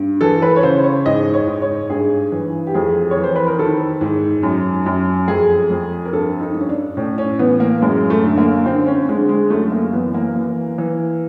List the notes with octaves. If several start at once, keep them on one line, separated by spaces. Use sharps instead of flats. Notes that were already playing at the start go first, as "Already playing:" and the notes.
Already playing: G2
E3 A4
B4
C#5
C#3 C5
C#5
G#2 D#5
C#5
G#2
C#5
G2 G#4
E3
G4
F2 G#4
C#5
E3
C5
B4
A#4
D#3 A4
G#2
F#2
F#2
F2 G#4
F2
A#4
G2 A4
D#4
G2
C#4
D4
A2 C#4
C#4
E3 B3
A#3
F#2 G#3
A3
D3
A#3
D3 C4
C#4
D3 G#3
G#3
F#2 A3
A#3
E3 B3
A#3
E3
E3